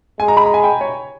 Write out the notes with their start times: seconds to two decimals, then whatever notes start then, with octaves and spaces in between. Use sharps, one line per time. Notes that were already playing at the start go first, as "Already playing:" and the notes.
0.20 G#3 G#5
0.28 A#5
0.37 B5
0.46 A#5
0.54 G#5
0.64 G5
0.81 C#5